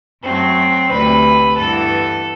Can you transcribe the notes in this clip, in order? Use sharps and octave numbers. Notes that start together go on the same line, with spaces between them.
F#2 F#3 A3 C4
D2 C3 G3 B4
G2 E3 B3 A4